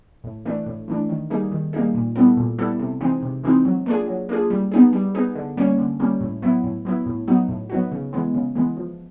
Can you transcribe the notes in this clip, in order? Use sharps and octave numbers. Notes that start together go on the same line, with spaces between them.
A2
E3 A3 D4
A2
E3 A3 D4
D#3
G3 A#3 D#4 G#4
D#3
G3 A#3 D#4 G#4
A#2
G3 B3 E4 A4
A#2
G3 B3 E4 A4
C3
E3 G#3 C4 D#4
C3
E3 G#3 C4 D#4
F#3
A#3 D4 F4 G#4
F#3
A#3 D4 F4 G#4
G3
B3 D#4 G#4
G3
B3 D#4 G#4
D3
G3 A#3 C#4
D3
G3 A#3 C#4
A2
F#3 B3 E4
A2
F#3 B3 E4
A2
F#3 B3 D#4 F#4
A2
F#3 B3 D#4 F#4
C#3
E3 G#3 B3
C#3
E3 G#3 B3
F3